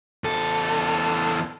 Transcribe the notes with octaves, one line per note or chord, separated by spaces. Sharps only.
E2 A4